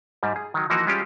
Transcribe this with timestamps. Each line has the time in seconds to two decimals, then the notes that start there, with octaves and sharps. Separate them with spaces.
0.23 G#2 G3
0.36 G#4
0.54 D#3 F#3
0.70 E3 F3 A#3 D#4 F#4 A#4
0.87 G3 G#3 C#4 F4 G4